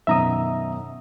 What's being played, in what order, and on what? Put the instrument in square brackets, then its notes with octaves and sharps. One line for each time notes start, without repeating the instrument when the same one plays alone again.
[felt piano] F#2 B2 D#3 [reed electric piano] E5 A#5 D#6